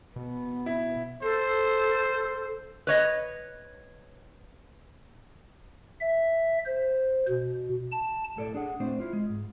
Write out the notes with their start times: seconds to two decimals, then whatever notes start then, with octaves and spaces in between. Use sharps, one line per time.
0.16 B2 B3
0.66 E4
1.22 A4 C5
2.87 B4 C#5 D#5
6.01 E5
6.66 C5
7.29 B2
7.92 A5
8.36 B1 A2 A4 D5
8.54 D4 G#4 F#5
8.80 A#2 A3 C4 D4 C5
8.99 E4 F4
9.13 G#3
9.29 G#2